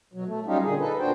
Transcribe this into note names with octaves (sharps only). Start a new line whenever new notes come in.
B2 F#3
A3
F#3 G3 C#4 D#4 F4 G4
A#2 D3 G#4
D#4 A4 B4
D2 A#2 D4 F#4 C5 G5